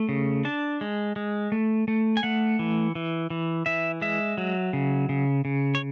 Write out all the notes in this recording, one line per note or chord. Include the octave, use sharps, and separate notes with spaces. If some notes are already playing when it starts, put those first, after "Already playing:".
Already playing: A3
C#3
D4 A5
G#3
G#3
A3
A3
G#5
A3 F#5
E3
E3
E3
E3 E5
G#3 E5
F#3
C#3
C#3
C#3
C#5